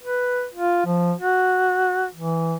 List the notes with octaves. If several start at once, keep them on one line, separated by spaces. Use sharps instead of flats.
B4
F4
F3
F#4
E3